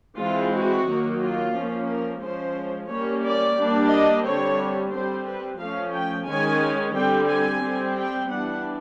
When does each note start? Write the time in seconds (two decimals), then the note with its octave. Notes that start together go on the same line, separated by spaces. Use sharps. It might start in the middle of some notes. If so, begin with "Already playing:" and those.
0.21 E3 G#3 C4 F4
0.55 F#4
0.88 D#3 F#3 A#3
1.23 F4
1.56 F3 A#3 C#4
1.90 A#4
2.24 F3 G#3 C#4 C5
2.91 G3 A#3 C#4 C#5
3.26 D5
3.58 G3 A#3 D4
3.92 D#5
4.26 D3 G3 C4 C#5
4.94 G3 C4 C5
5.27 B4
5.61 F3 A3 C#4 F5
5.96 G5
6.29 D#3 G#3 C#4 G#5
6.97 D3 G3 C4 G5
7.31 G#5
7.65 G3 C4
7.99 G5
8.32 E3 G3 B3 D4 F#5